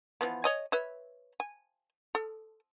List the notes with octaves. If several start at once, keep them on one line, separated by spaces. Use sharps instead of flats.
E3 F3 B3
C#5 D#5 G#5
B4 C#5 E5
G#5
A4